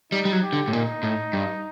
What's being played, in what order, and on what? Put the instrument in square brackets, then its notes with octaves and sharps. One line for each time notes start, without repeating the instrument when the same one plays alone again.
[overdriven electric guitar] G3 [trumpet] D#4
[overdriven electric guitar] G3
F#3
[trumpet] G4
[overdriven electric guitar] D3
A2
[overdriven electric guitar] A#2 [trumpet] D#4
[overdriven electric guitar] A2
G2